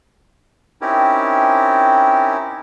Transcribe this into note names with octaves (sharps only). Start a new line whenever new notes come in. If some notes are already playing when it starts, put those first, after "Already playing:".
C4 C#4 D#4 E4 G4 A#4